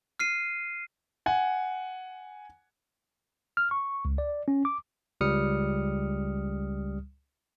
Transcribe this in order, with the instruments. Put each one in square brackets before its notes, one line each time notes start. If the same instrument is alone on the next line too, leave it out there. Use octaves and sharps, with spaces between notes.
[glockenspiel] F6 C7 D#7
[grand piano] F#5 G#5
[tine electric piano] F6
C#6
C#2
D5
C#4
D6
C#2 G3 D#6 F6 C#7